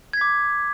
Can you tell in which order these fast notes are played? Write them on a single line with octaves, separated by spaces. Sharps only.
G#6 B6 D6